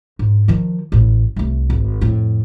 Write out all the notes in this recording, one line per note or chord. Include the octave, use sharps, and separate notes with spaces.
G#2
D#3 F3
A1 A2
C2 A3
G#1
F2 A2